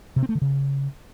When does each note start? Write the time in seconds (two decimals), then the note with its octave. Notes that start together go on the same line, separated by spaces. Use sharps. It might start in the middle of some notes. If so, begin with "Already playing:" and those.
0.16 C3
0.23 C4
0.29 A3
0.35 D3
0.42 C#3